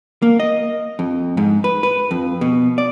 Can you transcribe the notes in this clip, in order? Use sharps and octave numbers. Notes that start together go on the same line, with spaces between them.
A#3
D#5
F2
G#2
B4
B4
F2
B2
D5